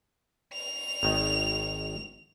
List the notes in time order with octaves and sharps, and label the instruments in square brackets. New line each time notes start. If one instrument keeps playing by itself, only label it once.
[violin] F7
[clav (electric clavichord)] G#1 D#3